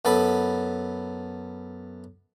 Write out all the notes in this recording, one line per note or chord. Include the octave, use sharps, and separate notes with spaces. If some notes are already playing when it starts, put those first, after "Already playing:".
F#2 B3 A4 B5